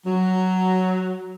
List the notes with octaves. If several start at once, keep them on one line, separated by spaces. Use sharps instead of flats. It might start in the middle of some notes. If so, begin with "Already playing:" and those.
F#3